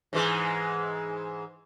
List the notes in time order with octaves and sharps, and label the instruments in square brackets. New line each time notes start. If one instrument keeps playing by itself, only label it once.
[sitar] G#2 E3 G#3